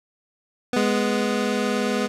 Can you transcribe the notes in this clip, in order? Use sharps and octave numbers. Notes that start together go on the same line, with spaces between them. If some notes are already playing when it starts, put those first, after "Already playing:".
G#3 B3